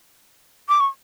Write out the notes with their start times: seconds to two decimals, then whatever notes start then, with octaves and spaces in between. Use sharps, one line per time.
0.69 D6
0.80 C#6